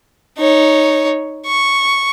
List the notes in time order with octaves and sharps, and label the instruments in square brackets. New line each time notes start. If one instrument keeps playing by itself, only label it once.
[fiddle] D#4 C#5
C#6